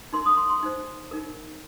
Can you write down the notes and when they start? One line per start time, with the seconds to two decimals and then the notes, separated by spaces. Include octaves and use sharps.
0.12 D#4 A#4 C6
0.26 D#6
0.37 C6
0.50 C6
0.62 D#4 C5
1.11 D#4 A#4